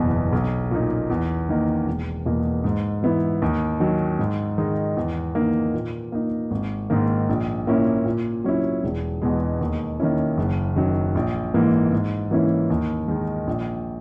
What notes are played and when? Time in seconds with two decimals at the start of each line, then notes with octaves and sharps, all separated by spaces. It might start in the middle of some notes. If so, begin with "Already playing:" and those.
Already playing: F#1 E2 B2
0.32 B1
0.71 A#2 A#3 D#4
1.10 E2
1.49 D#3 A#3 D#4
1.87 E1
2.26 E2 B2 A#3
2.64 G#2
3.03 E3 B3 E4
3.42 D#2
3.80 D#3 F#3
4.19 G#2
4.58 D#3 G#3 D#4
4.97 E2
5.35 D#3 A#3 D#4
5.74 A#2
6.12 A#3 D#4
6.51 G#1
6.90 G#2 D#3 A#3
7.29 A#1
7.67 A#2 A#3 C#4 E4
8.05 A#2
8.44 F#3 C#4 E4
8.83 E1
9.22 E2 B2 G#3
9.61 D#2
10.00 D#3 A#3 C#4 E4
10.38 F#1
10.76 F#2 D#3 F#3
11.15 A#1
11.54 G#2 E3 A#3
11.92 G#2
12.31 E3 A#3 C#4 E4
12.70 D#2
13.08 D#3 G#3 D#4
13.47 A#1